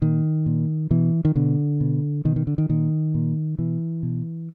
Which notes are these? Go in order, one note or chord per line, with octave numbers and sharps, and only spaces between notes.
A#2 D#3
A#2
B2 E3
D#3
B2 D3
B2
B2 D#3
D#3
D3
D#3
A#2 D#3
A#2
B2 E3
B2